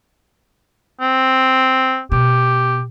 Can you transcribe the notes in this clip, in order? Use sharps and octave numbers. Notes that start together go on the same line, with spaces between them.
C4
B2 G4